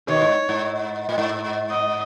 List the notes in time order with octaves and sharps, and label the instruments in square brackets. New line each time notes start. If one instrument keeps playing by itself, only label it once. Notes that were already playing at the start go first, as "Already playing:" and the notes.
[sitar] B2 D#3 [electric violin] C#5
[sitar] G#2
G#2
A2
G#2
[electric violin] D#5